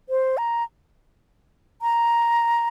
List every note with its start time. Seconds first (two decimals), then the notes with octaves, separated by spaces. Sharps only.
0.09 C5
0.38 A#5
1.82 A#5